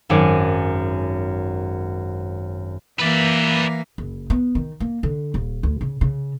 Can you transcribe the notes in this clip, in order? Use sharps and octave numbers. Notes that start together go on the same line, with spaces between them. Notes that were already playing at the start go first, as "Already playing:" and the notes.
G#1 F#2 G#5 D6 D7
E3 A#3 B4 D5
F#1
B3
D#3
A#3
D3
D#1
D2
C#3
C#3